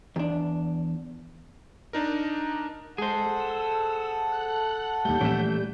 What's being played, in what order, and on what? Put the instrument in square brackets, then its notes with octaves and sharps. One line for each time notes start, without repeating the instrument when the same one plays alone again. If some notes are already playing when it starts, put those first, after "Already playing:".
[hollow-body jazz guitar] E2 D4
[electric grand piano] D4 D#4 A#4
[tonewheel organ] G#3 [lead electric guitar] G#4 C5 [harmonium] A4 F#5
[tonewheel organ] E6
F#6
[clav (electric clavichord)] D#2 A3 [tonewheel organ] G3 G6
[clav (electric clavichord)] A#1 C#4 [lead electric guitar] E3 A3